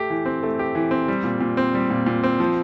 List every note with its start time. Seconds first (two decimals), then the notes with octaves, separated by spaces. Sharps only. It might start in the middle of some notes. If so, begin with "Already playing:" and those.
Already playing: A3 G4
0.10 E3
0.26 C4
0.43 A3
0.59 G4
0.75 E3
0.91 C4
1.08 G3
1.24 A#2
1.40 A#2
1.57 C4
1.74 G3
1.90 A#2
2.06 A#2
2.23 C4
2.40 F3